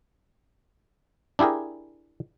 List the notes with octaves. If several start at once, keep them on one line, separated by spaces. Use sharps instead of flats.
D4 E4 G4 G#4 A#4